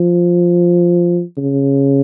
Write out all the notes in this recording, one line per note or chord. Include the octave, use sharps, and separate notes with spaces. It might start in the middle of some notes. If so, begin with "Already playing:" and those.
Already playing: F3
C#3